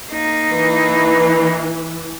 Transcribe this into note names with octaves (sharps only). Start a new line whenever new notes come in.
A#3 D#4
E3 B4